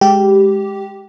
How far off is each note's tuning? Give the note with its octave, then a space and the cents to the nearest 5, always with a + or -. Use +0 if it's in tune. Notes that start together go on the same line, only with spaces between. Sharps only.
G#3 +0 G4 -10